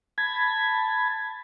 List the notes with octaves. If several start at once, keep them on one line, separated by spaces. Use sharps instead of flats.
A5 B5 G#6